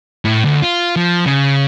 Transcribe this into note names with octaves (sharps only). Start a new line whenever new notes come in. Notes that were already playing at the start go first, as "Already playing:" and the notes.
A2
D2
F4
F3
C#3